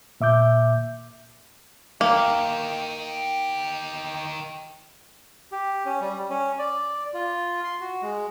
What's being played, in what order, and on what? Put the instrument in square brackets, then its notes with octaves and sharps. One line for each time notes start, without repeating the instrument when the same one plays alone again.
[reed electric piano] A#2 E5 D6 G6
[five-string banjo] A#3 [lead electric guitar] D#4 G4
[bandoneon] G4
C#4
G3
C#4
D5
F4
C6
F#4
G#3